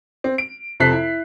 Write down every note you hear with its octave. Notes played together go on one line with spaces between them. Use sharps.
C4
D7
F2 C3 A4 F#6 B6 C7
E4